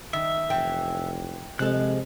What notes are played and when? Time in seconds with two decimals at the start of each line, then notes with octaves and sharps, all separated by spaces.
0.13 D#3 E5
0.50 F1 E3 G5
1.59 C3 F3 G#3 A4 F#6